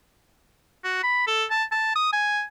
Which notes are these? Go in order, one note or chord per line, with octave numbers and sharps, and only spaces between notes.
F#4
B5
A4
A5
A5
D#6
G#5